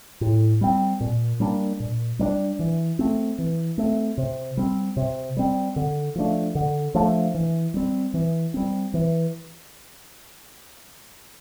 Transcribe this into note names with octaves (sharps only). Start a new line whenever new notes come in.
A2
G3 C4
A#2
G3 A#3 D4
A#2
G3 A#3 D4
E3
A3 C4
E3
A3 C4
C3
G3 C4
C3
G3 C4
D3
F3 A3 D4
D3
F3 A3 D4
E3
G3 C4
E3
G3 C4
E3